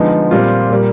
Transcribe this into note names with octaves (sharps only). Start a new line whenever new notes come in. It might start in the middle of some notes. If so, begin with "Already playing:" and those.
Already playing: D3 F3 G#3 B3 D#4
A#2 G3 C4 F4
A#2 G3 A#3